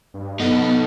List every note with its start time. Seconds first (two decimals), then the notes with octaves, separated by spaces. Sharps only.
0.14 G2
0.40 B3 D#4 A4